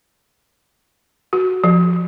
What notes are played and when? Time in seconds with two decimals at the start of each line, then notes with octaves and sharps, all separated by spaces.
1.33 F#4
1.64 F3